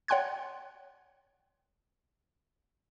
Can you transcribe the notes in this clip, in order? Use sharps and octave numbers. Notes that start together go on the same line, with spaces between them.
C#5 F#5 G5 C6 F#6 G#6